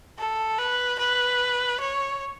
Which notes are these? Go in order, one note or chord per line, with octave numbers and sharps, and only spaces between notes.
A4
B4
B4
C#5